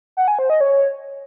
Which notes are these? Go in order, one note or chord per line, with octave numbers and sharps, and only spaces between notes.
F#5
G#5
C5
D#5
C#5